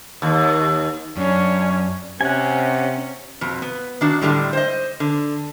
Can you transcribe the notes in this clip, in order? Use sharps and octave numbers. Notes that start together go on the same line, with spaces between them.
D#2
F#2 C#4 D4
C3 C#4 F#5 G#5
F2 B2
B3
D#3 D4 F#4
A2 D3 G3 G#3
C5 D#5
D3